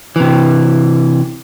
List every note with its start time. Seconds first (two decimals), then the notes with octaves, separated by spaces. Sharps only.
0.16 C3 E3